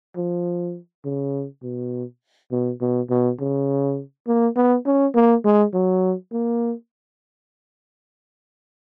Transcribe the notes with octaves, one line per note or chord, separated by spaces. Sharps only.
F3
C#3
B2
B2
B2
B2
C#3
A#3
B3
C#4
A#3
G#3
F#3
A#3